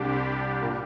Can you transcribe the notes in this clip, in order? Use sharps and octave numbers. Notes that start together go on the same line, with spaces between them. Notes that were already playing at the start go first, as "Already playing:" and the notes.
Already playing: C2 C3 G3 D4 G4
A#2 A#3